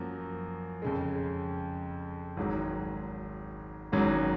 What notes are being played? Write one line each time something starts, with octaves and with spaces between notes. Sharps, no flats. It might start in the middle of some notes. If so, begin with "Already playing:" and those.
Already playing: F#2 F3 A#3 F#4
F2 C#3 G#3
G#1 G#2 F#3
G#1 G#2 F#3 C#4